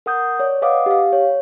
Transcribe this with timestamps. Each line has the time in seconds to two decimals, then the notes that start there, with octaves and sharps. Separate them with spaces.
0.06 A#4 F#5 D#6 G6
0.39 C#5 D5
0.62 B4 D#5 F5 F#5 D6 D#6
0.86 G4 F5
1.13 C#5